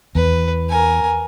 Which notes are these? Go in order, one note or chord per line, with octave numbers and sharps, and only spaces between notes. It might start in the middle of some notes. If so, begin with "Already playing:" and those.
E2 B4
A#4 G#5